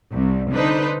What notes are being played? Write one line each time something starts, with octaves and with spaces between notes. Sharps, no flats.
C2
D3 D4 D#4 B4 C5